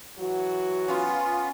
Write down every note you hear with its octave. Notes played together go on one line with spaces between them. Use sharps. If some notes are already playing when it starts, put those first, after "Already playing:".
E3 F#3 F#4
B3 C#4 F4